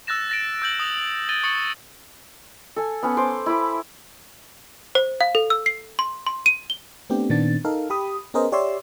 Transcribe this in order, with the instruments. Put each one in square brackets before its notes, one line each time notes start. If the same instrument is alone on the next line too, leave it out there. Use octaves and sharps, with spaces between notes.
[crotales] E6 F#6 A6 A#6 E7
A6 A#6 D7
E6 G6 F#7
D#6 F7
G#6 A6 D#7 G7
C#6 D#6 A6 C#7 F#7
[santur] A4 G#5
B3 C#4 F#5
C5 D6
E4 B5 D6
[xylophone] C5
F5
A4
E6
C7
C6
C6
D#7
G7
[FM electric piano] A3 B3 C4 D4 G4
A#2 D#3 B3 C4 D4 A6
D#4 A4 A#4 F5
G4 B5 D#6
B3 C#4 G#4 A#4 C5 D#5
G4 C#5 D5 E5 C6 E6